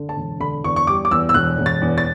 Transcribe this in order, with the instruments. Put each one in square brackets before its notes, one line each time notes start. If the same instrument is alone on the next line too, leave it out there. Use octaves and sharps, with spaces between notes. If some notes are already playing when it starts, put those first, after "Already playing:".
Already playing: [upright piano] D3
A5
E1
D3 B5
E2 C#6
C#6
G3 D6
D6
E2 E6
E6
E1 F#6
E1
A6
E2
A6